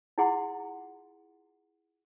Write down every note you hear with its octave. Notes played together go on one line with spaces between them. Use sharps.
E4 F4 G#4 F#5 A#5 C6